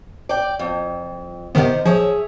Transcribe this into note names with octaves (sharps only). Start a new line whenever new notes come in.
D5 G5
F2
C3 D#3 B3 D#4 C5
F3 G#4 C#5 E5